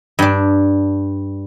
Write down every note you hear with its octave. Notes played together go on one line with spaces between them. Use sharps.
G2 D4